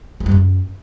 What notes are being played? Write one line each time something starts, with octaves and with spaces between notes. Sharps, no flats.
G#3
G2
F#2